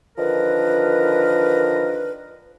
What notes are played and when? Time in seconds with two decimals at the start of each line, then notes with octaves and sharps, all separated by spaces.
0.17 D3 D#3 F3 A#4 B4